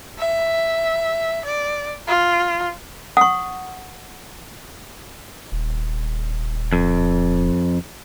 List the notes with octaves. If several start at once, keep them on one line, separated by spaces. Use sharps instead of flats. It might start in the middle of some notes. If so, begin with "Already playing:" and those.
E5
D5
F4
F#5 C#6 D#6
D#1
F2